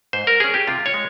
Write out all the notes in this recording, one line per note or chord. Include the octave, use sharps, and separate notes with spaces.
G#2 C5
A#4
G3 C#4 G#4
G4
C3 F4
C#5
G#3